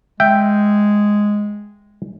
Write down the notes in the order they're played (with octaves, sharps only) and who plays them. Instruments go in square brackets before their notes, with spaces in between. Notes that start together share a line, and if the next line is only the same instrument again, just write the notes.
[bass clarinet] G#3 [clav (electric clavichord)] E5 G5